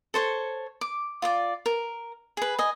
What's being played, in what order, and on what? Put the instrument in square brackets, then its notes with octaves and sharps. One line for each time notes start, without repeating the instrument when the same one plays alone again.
[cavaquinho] A4 C5 C#5
D6
F4 D5 D6
A#4
G#4 B4
D#5 G#5